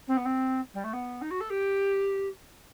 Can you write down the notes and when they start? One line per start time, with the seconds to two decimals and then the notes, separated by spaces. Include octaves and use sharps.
0.07 C4
0.16 B3
0.25 C4
0.74 G3
0.83 A3
0.93 B3
1.21 D#4
1.30 F#4
1.40 A4
1.49 G4